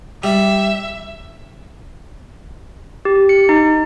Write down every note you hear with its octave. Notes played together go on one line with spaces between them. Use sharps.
G3 E5
G4
C#7
D#4